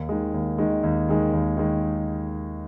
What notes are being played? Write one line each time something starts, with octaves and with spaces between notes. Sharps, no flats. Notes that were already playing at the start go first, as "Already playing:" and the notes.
Already playing: D#2
D#3 G#3
D#2
D#3 G#3
D#2
D#3 G#3
D#2
D#3 G#3